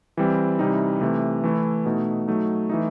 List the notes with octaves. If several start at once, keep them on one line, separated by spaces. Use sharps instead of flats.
E3 G3 C4
C3 E3 G3 D#4
C3 E3 A3
E3 A3 E4
B2 A3 D#4
F#3 A3 D#4
E3 A3 D#4